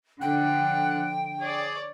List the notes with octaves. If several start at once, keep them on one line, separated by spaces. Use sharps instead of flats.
D3 F3 F#5 G5
G#4 C#5 D5